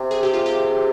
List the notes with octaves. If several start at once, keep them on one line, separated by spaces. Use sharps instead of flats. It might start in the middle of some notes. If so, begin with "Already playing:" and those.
Already playing: C3
G#4
G4
F4
G4